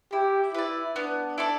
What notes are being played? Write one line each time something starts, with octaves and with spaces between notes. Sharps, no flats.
E4 G4
E4 B4 D5
B3 D4
E4 A4 D5